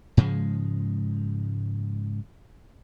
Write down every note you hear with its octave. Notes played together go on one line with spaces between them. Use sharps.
G#2 C#3 F3 G#3